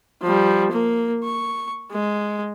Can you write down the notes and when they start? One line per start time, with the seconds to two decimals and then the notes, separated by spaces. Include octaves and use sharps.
0.22 F3 G3
0.72 A#3
1.24 C#6
1.92 G#3